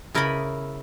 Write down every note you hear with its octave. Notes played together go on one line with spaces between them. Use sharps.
C#3 E4 A#4 D5 D#5 B5